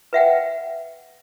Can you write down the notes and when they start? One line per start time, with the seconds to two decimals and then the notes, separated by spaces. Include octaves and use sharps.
0.13 B4 E5 F#5 G5